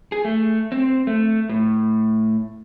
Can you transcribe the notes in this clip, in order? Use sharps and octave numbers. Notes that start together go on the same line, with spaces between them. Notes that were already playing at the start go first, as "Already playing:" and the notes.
G#4
A3
C4
A3
A2